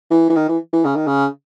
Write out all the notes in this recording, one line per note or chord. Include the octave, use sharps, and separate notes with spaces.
E3
E3
D#3
E3
E3
C#3
D#3
C#3